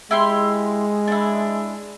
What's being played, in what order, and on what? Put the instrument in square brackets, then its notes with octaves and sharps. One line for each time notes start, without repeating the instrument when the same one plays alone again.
[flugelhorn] G#3 [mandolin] E4 G4 C6
[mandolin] D4 E4